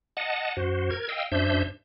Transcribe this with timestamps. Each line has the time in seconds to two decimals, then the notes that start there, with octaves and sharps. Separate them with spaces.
0.17 D#5 F#5 A5
0.57 F#2 F#4 C5
0.91 A#4 G#6
1.09 D#5 F5 G5 E6
1.32 F#2 D4 C5 E5 G6